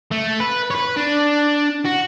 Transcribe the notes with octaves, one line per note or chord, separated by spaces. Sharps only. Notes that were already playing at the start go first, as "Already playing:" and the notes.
A3
B4
B4 C#5
D4
F#4